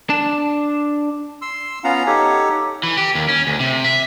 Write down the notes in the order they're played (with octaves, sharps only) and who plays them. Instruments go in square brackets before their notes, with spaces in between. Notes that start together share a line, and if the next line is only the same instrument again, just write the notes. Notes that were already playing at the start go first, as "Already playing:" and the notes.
[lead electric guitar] D4 A5
[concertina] C6 E6
B3 C#4 F4 F5 F#5 A#5
D#4 G4 A4 C#5 F#5
[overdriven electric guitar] E3
G4
D#2
C#4
D2
C3
E5